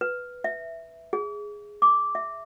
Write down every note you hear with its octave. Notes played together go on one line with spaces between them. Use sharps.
B4
E5
G#4
D6
E5